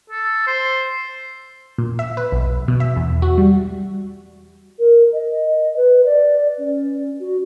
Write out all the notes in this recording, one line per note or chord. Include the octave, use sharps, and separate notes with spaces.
A4
C5
A#2
E5
B4
B1
B2
E5
E2
F#4
G3
A#4
D#5
B4
D5
C#4
F#4